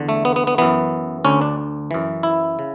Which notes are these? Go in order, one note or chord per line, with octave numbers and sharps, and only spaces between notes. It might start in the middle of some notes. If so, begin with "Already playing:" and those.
Already playing: E2 D3
A3
B3
B3
B3
F#2 E3 B3
D2 D3 C#4
D4
F#2 E3
E4
C#3